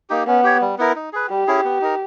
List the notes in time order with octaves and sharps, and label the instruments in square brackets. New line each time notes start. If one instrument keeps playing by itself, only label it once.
[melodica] A#3 D#4 G4
[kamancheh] B3 [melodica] C#4
[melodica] G4 C#5
G3
B3 E4 A#4
D#4
G#4 B4
[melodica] G3 [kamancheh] G4
[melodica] C#4 E4 G#4
B3
D#4 A#4